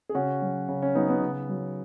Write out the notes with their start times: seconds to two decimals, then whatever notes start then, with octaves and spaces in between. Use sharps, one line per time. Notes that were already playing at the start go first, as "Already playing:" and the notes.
0.09 G#4
0.15 C#3 C#4 F#4
0.42 F#3
0.69 C#3
0.82 C#4
0.95 F#3 B3 D#4
1.09 B3
1.22 C#3
1.49 F#3